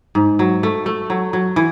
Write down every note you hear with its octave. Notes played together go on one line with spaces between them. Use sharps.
G#2
F#3
A3
A3
F#3
F#3
E3